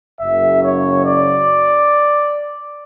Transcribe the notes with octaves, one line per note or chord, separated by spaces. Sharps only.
F#1 F#2 C#3 E5
C#5
D5